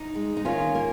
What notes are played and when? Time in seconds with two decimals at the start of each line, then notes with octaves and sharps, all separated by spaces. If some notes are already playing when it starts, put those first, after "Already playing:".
Already playing: D#4
0.15 G#3
0.37 D#4
0.45 D#3 C#4 F4
0.75 A#3